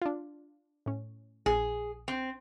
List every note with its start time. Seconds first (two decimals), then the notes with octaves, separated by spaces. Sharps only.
0.02 D4 F4
0.86 A2 C#4
1.46 A#1 G#4
2.08 C4